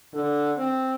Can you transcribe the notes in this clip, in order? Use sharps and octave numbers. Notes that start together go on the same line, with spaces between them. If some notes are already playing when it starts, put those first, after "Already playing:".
D3
C4